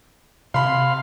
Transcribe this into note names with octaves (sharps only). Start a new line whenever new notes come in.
C3 F5 B5 C6